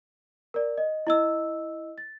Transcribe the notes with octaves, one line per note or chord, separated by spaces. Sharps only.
A#4 D5
D#5
E4 D#5 E6
A6